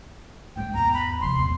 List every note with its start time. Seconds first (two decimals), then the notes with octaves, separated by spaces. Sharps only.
0.56 E3 G#3 G5
0.74 E2 G#2 A#5
0.94 B5
1.21 C3 F3 C6
1.39 E2 A#2